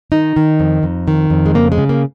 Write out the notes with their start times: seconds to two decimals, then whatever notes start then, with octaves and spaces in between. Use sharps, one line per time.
0.12 D#3 D#4
0.36 D#3
0.60 F2
0.83 F2
1.08 D#3
1.30 F2
1.46 G#3
1.54 C#3 A#3
1.72 G#3
1.78 C#3
1.89 A#3